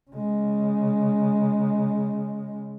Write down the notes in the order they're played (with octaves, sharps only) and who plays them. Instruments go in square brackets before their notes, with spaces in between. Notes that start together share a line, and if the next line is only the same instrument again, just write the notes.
[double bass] C#3 G#3